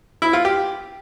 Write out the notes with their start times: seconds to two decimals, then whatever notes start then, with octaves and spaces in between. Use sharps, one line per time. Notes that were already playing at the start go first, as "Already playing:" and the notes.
0.22 E4
0.33 F4
0.45 G4